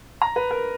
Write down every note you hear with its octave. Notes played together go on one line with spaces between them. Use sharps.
A#5
B4
A#4